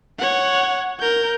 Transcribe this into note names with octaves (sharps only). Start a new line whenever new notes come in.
C#5 F#5
A#4 G6